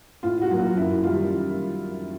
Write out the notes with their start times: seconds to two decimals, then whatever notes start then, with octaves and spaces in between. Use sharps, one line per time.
0.23 A2 F4
0.41 F#4
0.51 F#3 A#3
0.58 F4
0.76 F#2 E4
1.03 D#3 G3 F4